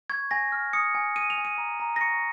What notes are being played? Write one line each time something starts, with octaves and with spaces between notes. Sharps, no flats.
C#6 G#6
G#5 A#6
F6
D#6 C#7
G#5
D#6 D#7
F7
G#5
D#7
A#5
A#5
A#6
C#6 C#7